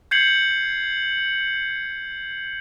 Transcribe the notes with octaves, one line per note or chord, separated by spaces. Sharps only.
G6 G#6 C7 C#7 F#7